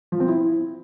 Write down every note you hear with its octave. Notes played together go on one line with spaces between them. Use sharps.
F3
C4
E4